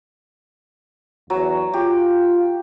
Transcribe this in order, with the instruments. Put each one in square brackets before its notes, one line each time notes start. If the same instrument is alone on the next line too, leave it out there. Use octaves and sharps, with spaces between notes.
[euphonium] E2 [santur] F#3
[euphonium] F4 [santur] G4